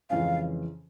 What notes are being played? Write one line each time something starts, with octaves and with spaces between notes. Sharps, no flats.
F2 C#3 E3 G#3 C#4 F5